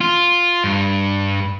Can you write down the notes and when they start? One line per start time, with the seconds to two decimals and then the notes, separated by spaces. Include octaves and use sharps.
0.01 F4
0.64 G2